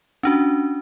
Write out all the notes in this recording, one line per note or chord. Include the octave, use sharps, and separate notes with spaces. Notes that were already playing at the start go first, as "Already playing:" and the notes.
C#4 D4 F#4